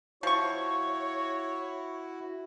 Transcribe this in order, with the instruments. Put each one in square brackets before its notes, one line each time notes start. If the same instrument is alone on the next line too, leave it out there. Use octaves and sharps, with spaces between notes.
[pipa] F3 C#6 [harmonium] E4 F#4 [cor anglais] C#5